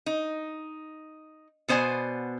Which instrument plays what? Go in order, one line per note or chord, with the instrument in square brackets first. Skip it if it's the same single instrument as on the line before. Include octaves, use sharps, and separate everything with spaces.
[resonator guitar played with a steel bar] D#4
B2 B3 C5 D5 G#5